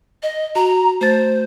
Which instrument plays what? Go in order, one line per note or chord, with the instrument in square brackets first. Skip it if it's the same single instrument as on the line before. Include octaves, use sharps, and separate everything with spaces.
[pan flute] D#5
[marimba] F#4 [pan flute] A#5
[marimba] A3 A6 [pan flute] C5